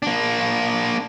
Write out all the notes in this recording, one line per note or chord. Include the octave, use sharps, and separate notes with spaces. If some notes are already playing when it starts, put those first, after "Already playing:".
A#3 D4